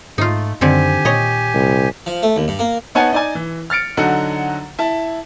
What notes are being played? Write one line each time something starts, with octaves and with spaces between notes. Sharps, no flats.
G#2 A3 D#4 F4
F#2 D3 D#3 C4 G4 G#5
A#2 C#5 D#5
C2
F3
A3
D#2
G2
A#3
B3 D#4 C#5 F#5 G#5 A5
D#4 D5 G#5
E3
F6 A6 C#7 D7
D3 F#3 D#4 F#4 A4 F#5
E4 A5